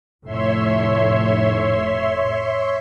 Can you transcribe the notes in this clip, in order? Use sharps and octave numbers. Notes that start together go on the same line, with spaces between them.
F1 A2 C#5 E5 C6